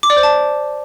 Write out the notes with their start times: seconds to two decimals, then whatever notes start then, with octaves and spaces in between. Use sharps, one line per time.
0.03 D6
0.10 D5
0.17 C5
0.23 A5